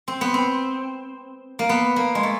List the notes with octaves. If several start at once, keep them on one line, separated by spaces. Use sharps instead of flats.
C4
B3
C4
A#3
B3
A#3
G#3
A3